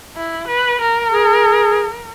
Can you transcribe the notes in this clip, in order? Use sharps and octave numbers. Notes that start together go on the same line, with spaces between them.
E4
B4
A#4
G#4